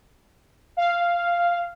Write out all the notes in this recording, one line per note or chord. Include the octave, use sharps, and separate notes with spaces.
F5